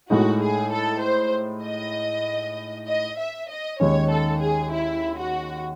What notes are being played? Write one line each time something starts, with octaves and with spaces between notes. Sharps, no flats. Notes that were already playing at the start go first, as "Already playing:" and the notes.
A2 G#3 D#4 F#4
G#4
A4
C5
D#5
D#5
E5
D#5
D#2 D#3 G#3 C#4 C#5
A4
G#4
E4
F#4